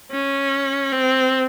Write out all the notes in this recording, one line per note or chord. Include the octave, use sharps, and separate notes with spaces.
C#4
C4